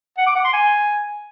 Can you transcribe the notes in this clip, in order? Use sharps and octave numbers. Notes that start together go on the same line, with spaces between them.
F#5
D6
F#5
C6
G#5